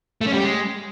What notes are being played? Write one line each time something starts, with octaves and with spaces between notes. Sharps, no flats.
A3
C#4
G3
G4
G#3